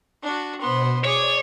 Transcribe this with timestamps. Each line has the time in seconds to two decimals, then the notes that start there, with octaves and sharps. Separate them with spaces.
0.23 D4 F#4
0.61 B2 B3 C5 C6
1.05 G#4 C#5 D5 D6